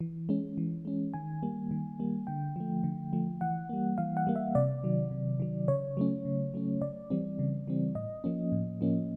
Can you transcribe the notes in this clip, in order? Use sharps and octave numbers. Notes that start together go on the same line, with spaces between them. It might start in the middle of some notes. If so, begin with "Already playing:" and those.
E3
G#3 C#4
E3
G#3 C#4
D#3 G#5
G3 A#3
D#3
G3 A#3
D3 G5
F3 A3
D3
F3 A3
E3 F#5
G3 A#3
E3 F5
F#5
G3 A#3
E5
C3 D5
D#3 F#3
C3
D#3 F#3
C#3 C#5
F#3 A3 C#4
C#3
F#3 A3 C#4
C#3 D5
E3 G3 C4
C#3
E3 G3 C4
A2 D#5
F3 A#3 C#4
A2
F3 A#3 C#4